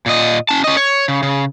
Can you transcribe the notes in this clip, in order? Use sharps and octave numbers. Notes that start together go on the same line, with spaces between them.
A#2 D#5
C#4 A5
C#4 D#5
C#5
C#3
C#3